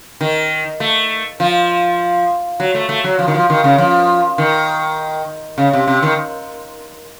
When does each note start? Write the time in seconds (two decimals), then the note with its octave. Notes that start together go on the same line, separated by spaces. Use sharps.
0.21 D#3
0.80 A3
1.40 F3
2.60 F#3
2.75 A3
2.89 A3
3.04 F#3
3.19 F3
3.28 D#3
3.34 F3
3.50 D#3
3.64 C#3
3.78 F3
4.38 D#3
5.58 C#3
5.73 C3
5.88 C3
6.02 D#3